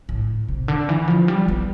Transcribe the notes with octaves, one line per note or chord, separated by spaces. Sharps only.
A2
C3
D3
E3
F3
G3
B3